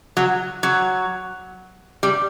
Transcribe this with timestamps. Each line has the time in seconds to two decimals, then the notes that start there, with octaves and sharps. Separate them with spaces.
0.17 F#3
0.63 F#3
2.03 G3